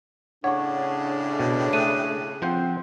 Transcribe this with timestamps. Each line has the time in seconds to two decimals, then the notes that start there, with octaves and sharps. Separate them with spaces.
0.44 A2 C#3 D4 C#5 F#5 C#6
1.40 B2
1.73 A3 D#6 F#6 D#7
2.42 F3 C4 C5 F#5